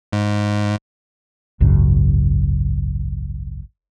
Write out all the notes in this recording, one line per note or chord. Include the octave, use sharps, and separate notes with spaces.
G#2
G#1 C#2 F#2 C#3